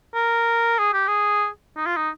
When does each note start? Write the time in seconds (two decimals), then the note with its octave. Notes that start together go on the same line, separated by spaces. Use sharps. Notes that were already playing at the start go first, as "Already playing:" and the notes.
0.15 A#4
0.79 G#4
0.93 G4
1.08 G#4
1.77 D#4
1.86 F4
1.96 D#4